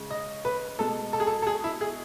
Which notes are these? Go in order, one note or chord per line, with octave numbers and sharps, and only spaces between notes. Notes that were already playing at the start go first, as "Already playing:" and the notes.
Already playing: C#3 G#3
D#5
B4
B2 G#3 A4
A4
G#4
A4
A4
G#4
E4
G#4